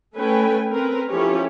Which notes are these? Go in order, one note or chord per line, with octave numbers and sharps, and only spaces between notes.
A3 C#4 A4 B4 G5 G#5
C4 A#4 B4
F3 C#4 E4 G4 A4 C#5